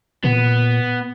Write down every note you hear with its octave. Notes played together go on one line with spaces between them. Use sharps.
A#2 B3